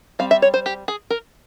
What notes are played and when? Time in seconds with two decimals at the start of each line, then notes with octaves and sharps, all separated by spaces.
0.19 G3 C4 F5
0.31 E5
0.42 C#5
0.54 C5
0.66 G4
0.88 G#4
1.10 A#4